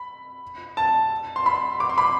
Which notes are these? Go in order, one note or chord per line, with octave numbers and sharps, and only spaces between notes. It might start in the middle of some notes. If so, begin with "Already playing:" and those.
Already playing: B5
A5
C6
B5
D6
C6
B5